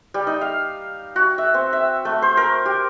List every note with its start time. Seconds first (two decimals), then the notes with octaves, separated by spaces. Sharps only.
0.14 G3
0.27 D#4
0.41 F5
1.16 F#4
1.38 E5
1.54 C4
1.73 E5
2.05 A3
2.22 C5
2.37 A#4
2.66 G4